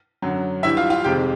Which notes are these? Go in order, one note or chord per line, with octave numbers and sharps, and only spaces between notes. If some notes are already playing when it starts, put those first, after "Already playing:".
F#2 D3 F#3
G2 E3 G3 E4 E5
F4 F5
F4 F5
F2 C3 D#3 G#3 G4 G5